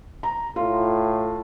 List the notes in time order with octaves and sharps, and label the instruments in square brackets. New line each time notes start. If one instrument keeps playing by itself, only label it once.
[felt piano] A#5
[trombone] A2 [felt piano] F4